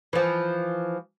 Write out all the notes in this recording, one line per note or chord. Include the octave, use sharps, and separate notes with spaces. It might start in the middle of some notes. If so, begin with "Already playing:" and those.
E3 F3